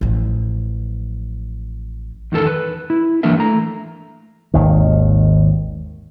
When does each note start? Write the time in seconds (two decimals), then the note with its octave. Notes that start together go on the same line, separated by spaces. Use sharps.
0.01 A1 F3
2.32 E2 D#3 G#3 A4 A#4
2.47 B4
2.90 E4
3.23 E3 F#3 A#3 D4 A#4 E5
3.38 A3 A#5
4.54 G#1 D#2 D#3